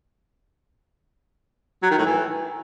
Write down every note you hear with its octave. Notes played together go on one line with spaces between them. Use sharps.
F#3
D#3
A2
E3